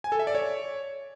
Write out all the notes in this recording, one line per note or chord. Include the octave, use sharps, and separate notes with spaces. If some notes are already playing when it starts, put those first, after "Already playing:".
G#5
A4
E5
D5
C#5